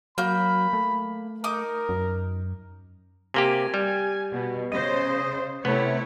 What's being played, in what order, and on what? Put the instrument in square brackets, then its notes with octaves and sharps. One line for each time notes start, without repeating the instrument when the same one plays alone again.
[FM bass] F#3 [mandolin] A#3 G6 [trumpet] B5
[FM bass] A3
[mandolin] D#4 D6 D#6 [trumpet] A#4
[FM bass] F#2
[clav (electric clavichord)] C3 A#3 G4 [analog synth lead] G#5
[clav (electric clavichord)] G3
[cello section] B2
[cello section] C#3 C5 [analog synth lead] D#5
[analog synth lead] C3 [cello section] A3 E4 C#5 [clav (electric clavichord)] B3